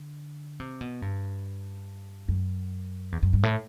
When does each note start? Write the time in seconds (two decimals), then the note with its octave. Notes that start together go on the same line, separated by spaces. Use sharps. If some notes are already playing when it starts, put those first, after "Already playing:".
Already playing: D3
0.60 C3
0.81 B2
1.02 G2
2.28 F#2
3.12 E2
3.23 F#2
3.33 G2
3.43 A2